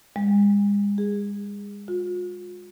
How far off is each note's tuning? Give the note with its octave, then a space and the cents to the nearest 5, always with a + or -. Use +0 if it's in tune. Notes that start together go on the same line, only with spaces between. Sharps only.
G#3 -40
G#4 -20
F4 +45